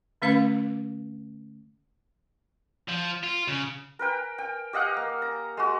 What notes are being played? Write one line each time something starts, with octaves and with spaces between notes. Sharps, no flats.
D3 A3 C#4 B4 F5 B5
F3
F4
C#3
A#4 B4 G5
G5
G4 D#5 F5 F#5
A#3
A#5
G#3 F#4